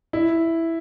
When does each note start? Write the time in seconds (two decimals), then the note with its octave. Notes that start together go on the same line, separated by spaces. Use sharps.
0.13 E4